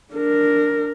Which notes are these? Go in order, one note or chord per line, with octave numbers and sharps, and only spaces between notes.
D4 A#4